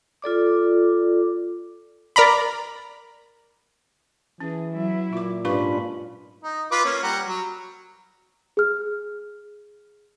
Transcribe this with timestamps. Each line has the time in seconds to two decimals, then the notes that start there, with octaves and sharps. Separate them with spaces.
0.22 F4 A4 D5 D6
2.16 A#4 D5 A#5 B5
4.40 E3 C#4 G#4
4.72 F#3 E4
5.13 A#2 F4 D6
5.45 G#2 C#4 D4 F4 G4 B4 B5 C#6
6.43 D#4
6.72 F4 B4 D6
6.85 A#3 C#4
7.03 G3 F#5 A#5
7.28 F#3
8.57 G#4 F6